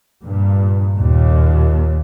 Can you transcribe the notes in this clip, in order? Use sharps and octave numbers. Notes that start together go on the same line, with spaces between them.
G2 A#2
D#2 A#2